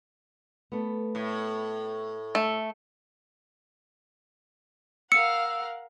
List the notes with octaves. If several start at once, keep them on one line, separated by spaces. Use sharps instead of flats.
A3 B3
A2
A3
A#4 F5 F#5 E6 C#7